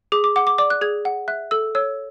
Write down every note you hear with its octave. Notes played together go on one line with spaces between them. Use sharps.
G#4 D6
D6
F#5 D6
D6
D5 D6
F#6
G#4 G#6
F#5
E5 F#6
A4 E6
C#5 E6